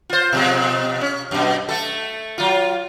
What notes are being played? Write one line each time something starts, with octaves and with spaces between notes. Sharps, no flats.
F4 C5
B2 F3 G#3
C#4
F#2 B2
A3 A4
F#3 F4